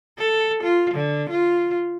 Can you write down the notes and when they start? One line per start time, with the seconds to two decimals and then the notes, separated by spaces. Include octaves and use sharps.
0.18 A4
0.63 F4
0.94 D3
1.29 F4